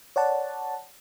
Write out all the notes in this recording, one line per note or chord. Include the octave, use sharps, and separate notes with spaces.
C#5 D5 F#5 A5